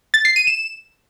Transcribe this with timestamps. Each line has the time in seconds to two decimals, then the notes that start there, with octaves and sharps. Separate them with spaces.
0.14 A6
0.25 C7
0.36 D#7
0.47 E7